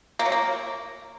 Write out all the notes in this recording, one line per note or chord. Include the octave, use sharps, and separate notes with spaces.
A#3
F#3
A#3